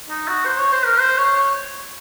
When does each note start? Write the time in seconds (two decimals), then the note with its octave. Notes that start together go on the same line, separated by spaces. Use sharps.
0.09 D#4
0.28 F#4
0.45 C5
0.59 C#5
0.72 C5
0.85 A#4
1.00 C5
1.17 C#5
1.36 C#5